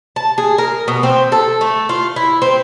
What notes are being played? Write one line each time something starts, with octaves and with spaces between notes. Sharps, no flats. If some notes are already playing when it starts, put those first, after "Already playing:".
A5
G#4
A#4
B2
C4
A4
A3
F4
E4
C4